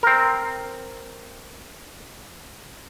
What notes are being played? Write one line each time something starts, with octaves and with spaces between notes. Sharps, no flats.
C4 A#4